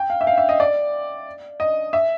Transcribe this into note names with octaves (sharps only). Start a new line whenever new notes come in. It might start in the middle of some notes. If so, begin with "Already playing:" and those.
Already playing: G5
F5
E5
F5
E5
D#5
D5
D#5
E5